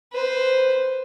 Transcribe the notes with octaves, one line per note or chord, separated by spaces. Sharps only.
B4 C5